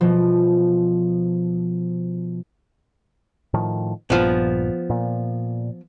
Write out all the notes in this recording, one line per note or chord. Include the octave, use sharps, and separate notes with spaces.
B2 F3
A2 D#3 F3
A#1 G2 A#2 F3 B3
A#2